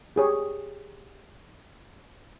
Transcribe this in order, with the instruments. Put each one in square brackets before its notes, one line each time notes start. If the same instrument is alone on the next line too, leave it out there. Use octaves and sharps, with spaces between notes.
[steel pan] G4 G#4 C#5